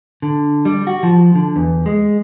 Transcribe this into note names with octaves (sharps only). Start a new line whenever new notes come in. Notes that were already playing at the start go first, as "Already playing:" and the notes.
D3
G3
F#4
F3
D3
E2
G#3